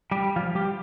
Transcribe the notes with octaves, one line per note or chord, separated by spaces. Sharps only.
G3 G4
F3 F4
G3 G4